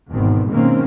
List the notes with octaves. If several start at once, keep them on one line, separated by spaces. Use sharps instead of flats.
G#1 E2 B2 D#3 B3 C4
B2 D#3 G#3 A#3 C4 C#4